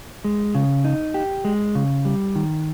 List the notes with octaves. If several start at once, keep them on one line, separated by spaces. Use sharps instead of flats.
G#3
C#3
D#4
G4
G#3
C#3
G3
D#3